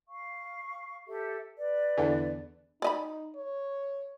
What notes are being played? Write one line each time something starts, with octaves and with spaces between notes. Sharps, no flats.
F5 C#6
G4 A4 E5
B4 D5
E2 D3 E3
D#4 D5 D#5 B5
C#5